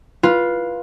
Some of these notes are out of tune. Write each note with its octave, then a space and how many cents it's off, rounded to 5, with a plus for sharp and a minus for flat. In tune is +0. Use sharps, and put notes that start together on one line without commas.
F4 +0 B4 -15